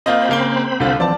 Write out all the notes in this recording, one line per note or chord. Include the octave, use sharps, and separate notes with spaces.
A#3 C4 F4 C5 D#5 B5
C#3 A#3 G7
C2 D3 F4
E3 F3 C4 D5 A5